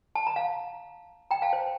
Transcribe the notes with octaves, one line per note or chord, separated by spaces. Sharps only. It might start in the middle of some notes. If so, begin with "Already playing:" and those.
A5
A#5
F5 A5
G5 A#5
F5 A5
C5